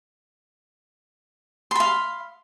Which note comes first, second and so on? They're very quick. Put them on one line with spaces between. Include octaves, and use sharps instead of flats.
C6 B5 F5